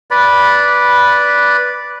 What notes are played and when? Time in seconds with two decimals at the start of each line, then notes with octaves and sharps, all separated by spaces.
0.11 B4 D5 B5